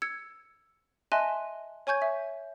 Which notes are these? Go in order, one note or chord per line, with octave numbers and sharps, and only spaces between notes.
E6 G#6 C#7
D#5 E5 G#5 A5 C6 F#6
C#5 G#5 C#6 G6 G#6
E5